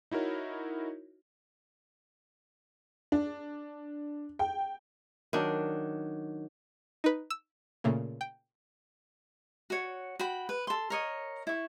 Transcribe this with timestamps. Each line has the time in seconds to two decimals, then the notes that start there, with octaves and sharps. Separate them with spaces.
0.11 D#4 E4 F#4 A#4 C#5
3.12 D4
4.39 G5
5.33 D#3 F#3 D4
7.04 D#4 B4
7.30 E6
7.84 A#2 C#3 A3 A#3
8.21 G5
9.70 F#4 C#5
10.19 F#4 G5 B5
10.49 B4
10.67 A4 C6
10.90 A#4 C#5 D#5
11.47 E4 C#6